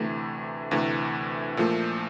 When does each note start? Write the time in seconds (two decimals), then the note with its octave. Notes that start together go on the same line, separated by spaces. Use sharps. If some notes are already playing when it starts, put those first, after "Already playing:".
Already playing: D2 C3 E3 A3
0.71 D2 C3 E3 A3
1.57 A#2 F3 A3